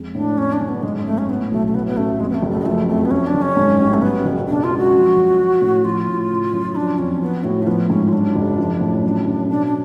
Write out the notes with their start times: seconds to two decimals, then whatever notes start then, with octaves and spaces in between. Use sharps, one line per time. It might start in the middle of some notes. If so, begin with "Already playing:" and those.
Already playing: F2 G#3
0.14 A2 D4
0.38 F2 C#4
0.53 D4
0.61 F#1
0.68 B3
0.83 G#2 G#3
0.97 G#3
1.06 A1 A3
1.18 C#4
1.29 A2 B3
1.52 B1 A3
1.67 A3
1.75 A2 B3
1.87 B3
1.97 A1 A3
2.20 F2 G#3
2.29 B3
2.35 A3
2.42 F#1
2.51 A3
2.60 G#3
2.66 F3 A3
2.88 F2 A3
3.05 B3
3.11 F2 C#4
3.27 D4
3.34 F#1
3.42 C#4
3.57 G#2
3.79 A1
3.94 A3
4.02 F#2 B3
4.25 F#1
4.48 B2 D4
4.64 F4
4.71 C#2
4.78 F#4
4.94 F3
5.16 F#2
5.39 F3
5.62 A2
5.84 F3 F4
6.08 A2
6.30 C#3
6.53 F#2
6.76 F3 D4
6.98 F2 C#4
7.21 F3 B3
7.44 A2 F#4
7.63 A3
7.67 F3 B3
7.90 G#2 C#4
8.08 F4
8.12 F#2 D4
8.35 F#1
8.58 F3
8.81 A2
9.04 F#2
9.27 F#1
9.49 B2 D4
9.66 D4